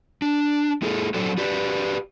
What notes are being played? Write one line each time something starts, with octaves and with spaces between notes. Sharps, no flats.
D4
A3 E4 G#4 A4
F#3 D4 F#4 A4 C5
F#4 G4 B4 D5